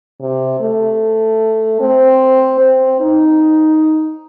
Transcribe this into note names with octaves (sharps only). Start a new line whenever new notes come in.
C3
A3
C4
C4
D#4